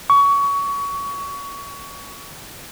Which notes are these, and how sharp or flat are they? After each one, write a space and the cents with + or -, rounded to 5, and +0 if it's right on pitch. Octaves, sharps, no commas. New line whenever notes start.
C#6 +25